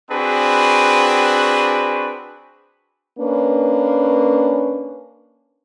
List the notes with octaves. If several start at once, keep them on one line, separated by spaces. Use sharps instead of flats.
C4 D4 F#4 G#4 B4
A#3 C#4 D4 B4